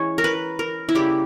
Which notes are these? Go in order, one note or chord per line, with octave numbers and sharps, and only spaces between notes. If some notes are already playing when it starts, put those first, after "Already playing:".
Already playing: E3 G#3 C#4 C#5
A#4
B4
A#4
E4
C#3 G3 A#3 G4